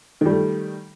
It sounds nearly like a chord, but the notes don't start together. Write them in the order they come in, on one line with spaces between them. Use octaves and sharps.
D#3 G3 A3